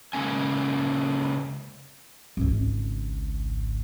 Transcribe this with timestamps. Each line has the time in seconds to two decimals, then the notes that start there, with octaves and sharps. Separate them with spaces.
0.13 C#3 G#3 A#3 C#4 G#5
2.37 G#1 C#2